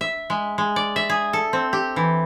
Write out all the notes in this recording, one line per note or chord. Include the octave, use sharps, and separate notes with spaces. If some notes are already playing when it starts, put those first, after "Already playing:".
E5
G#3
G#3
D5
E5
G#4
A4
C4
G4
E3